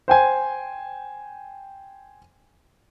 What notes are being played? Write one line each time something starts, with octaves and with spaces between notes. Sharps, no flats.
C5 G5 G#5